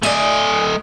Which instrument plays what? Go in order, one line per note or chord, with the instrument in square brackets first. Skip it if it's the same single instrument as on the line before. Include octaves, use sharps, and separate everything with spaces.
[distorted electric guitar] A3 D#5 [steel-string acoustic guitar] D5 G#5